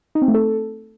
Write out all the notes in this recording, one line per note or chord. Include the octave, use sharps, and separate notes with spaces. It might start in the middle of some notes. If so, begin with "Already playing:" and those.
D#4
C4
A3
A4